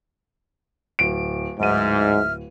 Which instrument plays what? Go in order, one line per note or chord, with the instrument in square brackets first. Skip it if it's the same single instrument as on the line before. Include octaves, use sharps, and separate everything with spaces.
[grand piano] D1 D7
[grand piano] D1 D#7 [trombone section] G#2 [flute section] E5 F6